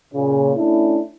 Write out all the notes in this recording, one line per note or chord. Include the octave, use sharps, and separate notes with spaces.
A#2 C#3
A3 C#4 D4 E4